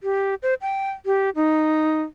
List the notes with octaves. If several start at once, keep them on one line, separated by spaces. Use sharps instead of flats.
G4
C5
G5
G4
D#4